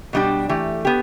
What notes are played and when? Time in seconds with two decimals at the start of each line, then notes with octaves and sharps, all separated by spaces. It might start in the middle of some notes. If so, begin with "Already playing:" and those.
0.13 B2 G3 D4 G4
0.49 E3 A3 G4
0.85 B3 G4